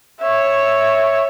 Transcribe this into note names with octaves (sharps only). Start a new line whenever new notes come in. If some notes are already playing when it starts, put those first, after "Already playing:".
C#5 E5